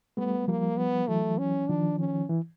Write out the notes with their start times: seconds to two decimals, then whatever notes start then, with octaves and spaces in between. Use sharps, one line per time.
0.17 G3 A3 B3
0.48 F3 G3 A#3
0.78 B3
1.08 E3 F#3 A3
1.38 C#4
1.69 D#3 F3 D4
1.99 C#4
2.29 E3